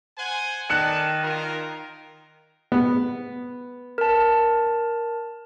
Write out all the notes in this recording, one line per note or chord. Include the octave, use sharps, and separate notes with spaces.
C5 F#5 G#5
D#3 D5 A5 F#6 C#7 E7
D#4 F4 A#4
B3
A#4 A5